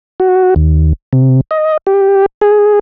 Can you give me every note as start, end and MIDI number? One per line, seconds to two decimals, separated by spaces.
0.20 0.54 66
0.56 0.93 39
1.13 1.41 48
1.51 1.77 75
1.87 2.26 67
2.41 2.79 68